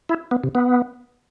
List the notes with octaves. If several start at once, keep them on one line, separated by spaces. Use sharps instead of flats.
E4
B3
C3
B3